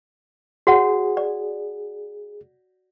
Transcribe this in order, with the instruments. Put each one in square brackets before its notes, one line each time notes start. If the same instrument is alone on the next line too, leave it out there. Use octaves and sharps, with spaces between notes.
[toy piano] F#4 C#5 F#5 [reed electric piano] G#4
[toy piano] D5